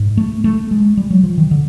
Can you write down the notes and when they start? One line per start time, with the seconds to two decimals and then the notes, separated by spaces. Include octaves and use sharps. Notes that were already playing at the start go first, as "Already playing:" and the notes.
Already playing: G#2
0.17 A3
0.44 A3
0.71 G#3
0.97 G3
1.11 F#3
1.24 F3
1.38 D#3
1.51 D3